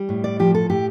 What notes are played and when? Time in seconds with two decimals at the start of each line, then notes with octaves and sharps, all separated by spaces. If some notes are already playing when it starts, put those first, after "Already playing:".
Already playing: G3
0.09 A2
0.24 D5
0.39 F3 G4
0.55 A4
0.70 A2 G4